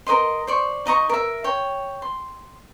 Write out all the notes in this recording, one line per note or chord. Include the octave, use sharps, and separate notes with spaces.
A#4 C5 D#5 C6
C5 D5 C#6
D#4 D#5 A#5 C#6
A#4 E5
C#5 G5
C6